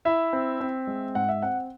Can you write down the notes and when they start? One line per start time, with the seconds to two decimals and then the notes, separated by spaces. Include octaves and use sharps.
0.05 E4 E5
0.33 C4
0.61 C4
0.87 G#3
1.15 G#2 F#5
1.29 E5
1.42 C4 F#5